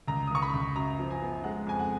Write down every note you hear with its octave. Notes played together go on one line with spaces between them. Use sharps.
C#2 A#5
D#6
C#2 C#6
B5
C#2
F#2 A#5
F3
G#5
B3
G#3 F#5
F2 G#5
F#5